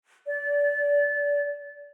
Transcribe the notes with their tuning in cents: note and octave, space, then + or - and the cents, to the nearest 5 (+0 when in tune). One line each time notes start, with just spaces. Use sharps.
D5 -25